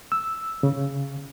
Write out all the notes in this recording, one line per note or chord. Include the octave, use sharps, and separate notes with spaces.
E6
C#3